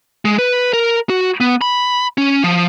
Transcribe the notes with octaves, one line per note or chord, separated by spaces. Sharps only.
G#3
B4
A#4
F#4
B3
B5
C#4
F3